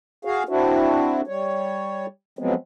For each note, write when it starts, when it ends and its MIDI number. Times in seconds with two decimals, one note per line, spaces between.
0.25 0.43 66
0.25 0.43 68
0.25 0.43 77
0.49 1.21 60
0.49 1.21 62
0.49 1.21 64
0.49 1.21 66
1.27 2.06 55
1.27 2.06 73
2.39 2.54 53
2.39 2.54 54
2.39 2.54 56
2.39 2.54 59
2.39 2.54 60